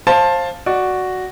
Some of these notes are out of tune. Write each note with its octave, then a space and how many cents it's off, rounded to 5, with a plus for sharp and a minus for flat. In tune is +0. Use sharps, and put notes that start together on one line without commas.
C5 +25 F5 +0 A5 +0
F#4 +0 D5 +0